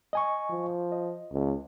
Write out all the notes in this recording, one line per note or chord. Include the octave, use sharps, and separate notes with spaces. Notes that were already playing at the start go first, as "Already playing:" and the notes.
D#5 G#5 C#6
F3
D#5
C#2